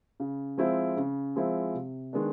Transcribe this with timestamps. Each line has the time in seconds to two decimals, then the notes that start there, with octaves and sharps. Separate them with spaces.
0.20 C#3
0.57 F3 G#3 C4 E4
0.97 C#3
1.36 F3 G#3 C4 E4
1.74 C3
2.13 D#3 G#3 B3 D4